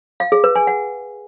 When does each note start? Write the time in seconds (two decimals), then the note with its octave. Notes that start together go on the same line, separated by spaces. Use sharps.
0.20 F5
0.32 G#4
0.44 B4
0.56 G#5
0.67 F#5